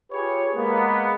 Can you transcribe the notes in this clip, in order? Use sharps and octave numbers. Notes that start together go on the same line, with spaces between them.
F4 G4 G#4 B4 C#5
G#3 A#3 B3